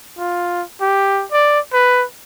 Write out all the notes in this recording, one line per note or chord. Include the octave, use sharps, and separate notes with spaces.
F4
G4
D5
B4